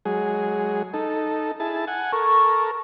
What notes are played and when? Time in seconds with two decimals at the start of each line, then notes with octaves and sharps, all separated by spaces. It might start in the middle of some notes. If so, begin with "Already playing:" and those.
0.05 F#3 G#3 G#4
0.94 D#4 A4
1.60 E4 G#4 A5
1.87 F#5 G#5
2.12 A4 A#4 C#6